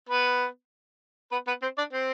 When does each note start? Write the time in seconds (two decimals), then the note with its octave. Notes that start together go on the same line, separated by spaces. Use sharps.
0.09 B3 B4
1.32 B3 B4
1.47 B3 B4
1.62 C4 C5
1.78 D4 D5
1.93 C4 C5